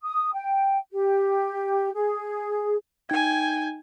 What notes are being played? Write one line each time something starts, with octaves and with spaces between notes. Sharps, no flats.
D#6
G5
G4
G#4
D#4 G5 G#5 G#6